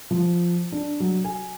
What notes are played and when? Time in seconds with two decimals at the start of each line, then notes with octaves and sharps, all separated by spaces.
0.11 F3
0.72 D4
1.00 F#3
1.25 G#5